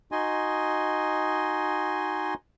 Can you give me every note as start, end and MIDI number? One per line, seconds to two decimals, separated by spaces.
0.12 2.34 63
0.12 2.34 66
0.12 2.34 75
0.12 2.34 80
0.12 2.34 84